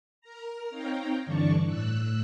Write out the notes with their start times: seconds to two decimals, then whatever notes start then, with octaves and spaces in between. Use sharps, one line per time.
0.21 A#4 A#5
0.70 C4 D#4 C#5 F5 G5 A#5
1.26 G2 D3 E3 D5 A5 C#6
1.64 A2 E6 F#6